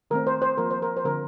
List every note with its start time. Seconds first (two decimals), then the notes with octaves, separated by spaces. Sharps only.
0.11 D#3 A3 C4 A#4
0.27 C5
0.42 C5
0.58 F3 A#3 A#4
0.71 C5
0.82 A#4
0.97 C5
1.05 D3 F3 C4 A#4